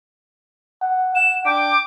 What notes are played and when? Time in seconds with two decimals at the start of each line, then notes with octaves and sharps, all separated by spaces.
0.82 F#5
1.15 F#5 E7
1.45 D4 G5 D6